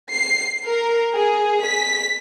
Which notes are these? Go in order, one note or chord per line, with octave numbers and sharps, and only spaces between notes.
C7
A#4
G#4
B6